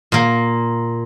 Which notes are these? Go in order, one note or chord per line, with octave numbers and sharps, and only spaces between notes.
A#2 A#3